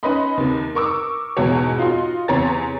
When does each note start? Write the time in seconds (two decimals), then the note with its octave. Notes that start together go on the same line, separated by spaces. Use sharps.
0.03 C#4 D#4 B4 D#5 B5 C6
0.37 D#2 C3
0.75 A#4 C#6 D6 E6
1.37 E2 G#2 B2 F#4 C#5
1.78 D#4 F4 F#4 C6
2.28 E2 C3 C#5 A#5 C6 A6